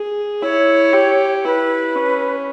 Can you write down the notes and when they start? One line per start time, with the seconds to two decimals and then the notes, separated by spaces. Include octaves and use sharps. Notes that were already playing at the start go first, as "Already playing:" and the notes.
Already playing: G#4
0.42 E4 C#5
0.93 G4
1.45 E4 B4
1.95 C#4